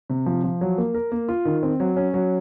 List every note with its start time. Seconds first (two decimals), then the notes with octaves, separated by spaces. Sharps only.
0.10 C3
0.26 F3
0.44 F3
0.61 F#3
0.78 A#3
0.94 A#4
1.12 A#3
1.29 F4
1.45 D#3
1.63 C4
1.80 F#3
1.96 C#4
2.14 F#3